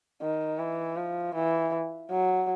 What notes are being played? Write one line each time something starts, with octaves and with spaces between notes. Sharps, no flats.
D#3
E3
F3
E3
F#3